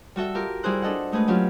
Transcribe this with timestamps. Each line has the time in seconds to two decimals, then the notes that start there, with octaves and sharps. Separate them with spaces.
0.16 G3 F#4 A4 E5
0.34 F4 G4 A#4
0.63 G3 E4 G#4 C5 F#6
0.82 D4 A4 D#5 F#5
1.12 G#3 A3 G#4 B4
1.28 F#3 C#4 F4 G4